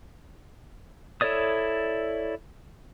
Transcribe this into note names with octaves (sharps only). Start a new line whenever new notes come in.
E4 A4 C#5 D5 D#6